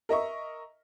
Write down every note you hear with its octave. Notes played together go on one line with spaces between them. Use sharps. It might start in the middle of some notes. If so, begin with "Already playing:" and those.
A#4 D#5 E5 C#6